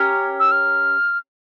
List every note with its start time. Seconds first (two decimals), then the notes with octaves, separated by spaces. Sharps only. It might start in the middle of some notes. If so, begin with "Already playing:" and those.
Already playing: C#4 G4 A#4 C#5
0.40 E6
0.52 F6